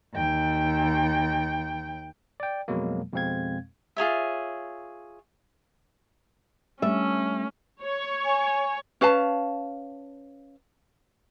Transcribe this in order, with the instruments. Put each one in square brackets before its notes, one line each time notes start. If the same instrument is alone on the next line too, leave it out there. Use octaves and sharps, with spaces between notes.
[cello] D#2 G5
[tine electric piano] D5 G5
F2 B2 F#3 G#3 A#3
F2 B2 G#3 C4 F5 G#6
[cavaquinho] F4 G#4 C#5 E5
[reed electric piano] G3 [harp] A3 D4 E4 [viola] C#4 [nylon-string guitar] E5
[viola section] C#5
[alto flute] G#5
[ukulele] C#4 B4 F5 A5